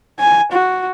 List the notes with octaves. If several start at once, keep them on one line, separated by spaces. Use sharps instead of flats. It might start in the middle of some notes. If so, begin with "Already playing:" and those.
G#5
F#4